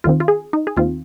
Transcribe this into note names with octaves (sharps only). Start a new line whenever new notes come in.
D#2 D#3 C4 F4
F4
G#4
D#4
G#4
D#2 D#3 C4 F4